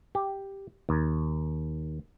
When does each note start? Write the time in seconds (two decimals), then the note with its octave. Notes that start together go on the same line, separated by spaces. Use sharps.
0.15 G4
0.89 D#2